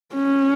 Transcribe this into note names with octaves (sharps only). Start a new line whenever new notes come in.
C#4